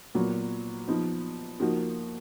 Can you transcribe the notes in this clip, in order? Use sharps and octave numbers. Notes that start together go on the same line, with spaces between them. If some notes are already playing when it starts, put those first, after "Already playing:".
A#2 F#3 B3 F#4
F3 B3 D#4
F3 A#3 D#4 F#4